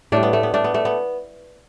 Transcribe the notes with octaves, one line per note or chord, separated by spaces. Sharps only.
A2 G3 A3 D4
B3
A3
B3
A3 D4
B3
A3
B3